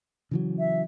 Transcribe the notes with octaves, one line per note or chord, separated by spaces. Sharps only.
C#3 E3 F#3
E5